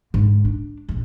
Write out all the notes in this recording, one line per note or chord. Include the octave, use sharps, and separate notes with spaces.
G#2 D3
D4
A#1 E2